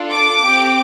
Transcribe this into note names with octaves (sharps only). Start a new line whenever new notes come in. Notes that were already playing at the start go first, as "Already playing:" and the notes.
Already playing: D4 F4 A4
D6
C4 G4